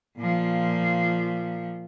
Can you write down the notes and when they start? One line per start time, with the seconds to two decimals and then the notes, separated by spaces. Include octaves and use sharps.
0.18 A#2 F3